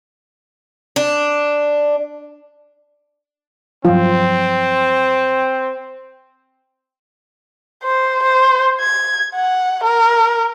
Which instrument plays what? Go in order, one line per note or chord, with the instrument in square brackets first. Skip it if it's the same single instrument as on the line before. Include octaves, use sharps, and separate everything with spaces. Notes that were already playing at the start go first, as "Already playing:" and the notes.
[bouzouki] D4
[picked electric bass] G2 F3 F#3 [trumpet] C4 [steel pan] F4
[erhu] C5
C5
G#6
F#5
A#4